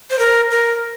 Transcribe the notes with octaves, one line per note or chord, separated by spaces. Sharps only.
C5
A#4
A#4